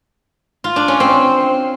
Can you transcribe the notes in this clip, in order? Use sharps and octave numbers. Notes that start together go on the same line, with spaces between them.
F4
D4
C#4
C4